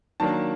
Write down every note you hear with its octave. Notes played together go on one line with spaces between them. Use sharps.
D#3 F#3 A#3 D4 A5